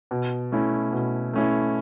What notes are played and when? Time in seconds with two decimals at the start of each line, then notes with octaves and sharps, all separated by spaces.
0.11 B2
0.52 A3 C#4 E4
0.93 B2
1.33 A3 C#4 E4